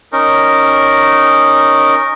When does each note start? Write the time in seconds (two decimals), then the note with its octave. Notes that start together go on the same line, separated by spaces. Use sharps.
0.12 C#4 D#4 A#4